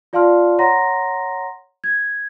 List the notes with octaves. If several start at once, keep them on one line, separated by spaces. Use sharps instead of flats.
F4 D5 F5 A5 C6 F6
C#5 F#5 A#5 C6 A#6
G#6